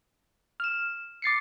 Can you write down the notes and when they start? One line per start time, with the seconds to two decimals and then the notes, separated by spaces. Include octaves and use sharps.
0.60 F6 E7
1.22 D6 A6 C7 C#7